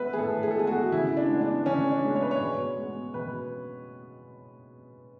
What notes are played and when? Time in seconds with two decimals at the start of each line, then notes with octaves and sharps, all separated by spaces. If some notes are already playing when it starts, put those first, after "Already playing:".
Already playing: A2 G#3 B3 B4 E5
0.13 G#4
0.18 A2 A4
0.43 G#4
0.51 A4
0.55 G#3 B3 G#4
0.67 F#4
0.92 C#3 E4
1.17 D4
1.29 G#3 B3
1.41 D4
1.66 C#3 C#4
1.91 D4
2.04 G#3 B3
2.15 C#5
2.23 B4
2.31 C#5
2.41 B2
2.77 G#3 B3
3.14 B2 B4